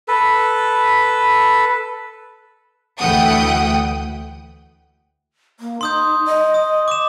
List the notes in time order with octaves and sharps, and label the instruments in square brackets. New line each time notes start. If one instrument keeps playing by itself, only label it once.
[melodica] A4 B4
[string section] D2 E3 A3 F#5 G5 D#6
[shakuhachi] A#3
[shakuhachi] D#4 [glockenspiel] C6 D#6 G6
[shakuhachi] D#5
[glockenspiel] D#6
D6 E7